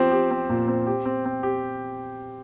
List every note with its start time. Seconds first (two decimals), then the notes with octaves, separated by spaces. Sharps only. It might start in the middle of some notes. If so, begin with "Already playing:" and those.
Already playing: F3 C4 G4
0.11 G4
0.31 C4
0.49 A#2
0.68 C4
0.87 G4
1.05 C4
1.25 C4
1.43 G4